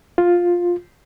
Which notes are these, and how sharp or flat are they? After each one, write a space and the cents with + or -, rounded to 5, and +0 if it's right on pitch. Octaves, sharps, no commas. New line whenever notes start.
F4 +10